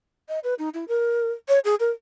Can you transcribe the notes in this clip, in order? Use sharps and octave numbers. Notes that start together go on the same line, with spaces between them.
D#5
B4
D#4
E4
A#4
C#5
G#4
A#4